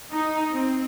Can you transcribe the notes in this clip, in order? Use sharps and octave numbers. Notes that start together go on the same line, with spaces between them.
D#4
C4